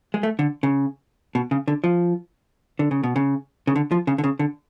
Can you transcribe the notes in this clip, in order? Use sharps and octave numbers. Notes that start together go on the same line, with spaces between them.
G#3
A3
D3
C#3
B2
C#3
D3
F3
D3
C#3
B2
C#3
C#3
D3
F3
C#3
D3
C#3
D3